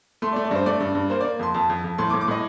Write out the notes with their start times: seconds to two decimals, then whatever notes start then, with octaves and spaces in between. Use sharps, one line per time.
0.22 A3 C6
0.33 D5
0.36 A3
0.45 D5
0.51 G2 C5
0.66 A3 D5
0.80 G2
0.95 G2
1.10 A#3 C5
1.21 A#3 D5
1.39 F2 C6
1.54 F2 A5
1.70 F2
1.84 F2
1.98 A2 C6
2.10 D6
2.13 A2
2.21 D6
2.28 A2 D#5